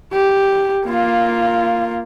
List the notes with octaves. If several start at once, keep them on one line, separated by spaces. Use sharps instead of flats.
G4
A#3 F4